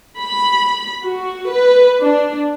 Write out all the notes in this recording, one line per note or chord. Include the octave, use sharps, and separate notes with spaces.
B5
F#4
B4
D4